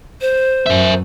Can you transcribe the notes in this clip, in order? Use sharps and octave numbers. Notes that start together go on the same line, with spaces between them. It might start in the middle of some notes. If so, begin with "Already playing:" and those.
C5
F#2 A#4 E5